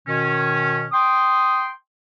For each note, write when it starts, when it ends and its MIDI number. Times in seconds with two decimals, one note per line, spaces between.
0.07 0.86 47
0.07 0.86 51
0.07 0.86 61
0.92 1.68 79
0.92 1.68 84
0.92 1.68 87